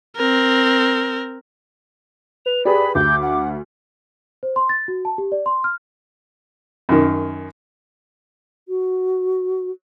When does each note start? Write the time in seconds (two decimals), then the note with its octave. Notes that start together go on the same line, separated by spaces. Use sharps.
0.16 C4 A#4
2.46 B4 F7
2.65 G4 G#4 B4 D5 B5
2.95 D2 D6 G6
3.22 F#5
4.43 C5
4.56 C6
4.69 A6
4.88 F#4
5.05 A5
5.18 G4
5.32 D5
5.46 C6
5.64 F6
6.89 F#2 D#3
8.68 F#4